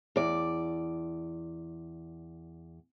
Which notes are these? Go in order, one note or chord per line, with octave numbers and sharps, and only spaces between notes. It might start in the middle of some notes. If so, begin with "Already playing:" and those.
E2 D5